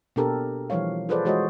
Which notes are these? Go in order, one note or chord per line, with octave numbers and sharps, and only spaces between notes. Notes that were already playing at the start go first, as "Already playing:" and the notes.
B2 A#3 D4 G4 A4 A#4
E3 F3 G3 C#5 F5
F4 G#4 A4 B4 C5 D5
E3 G#3 F#4 C5 C#5 D#5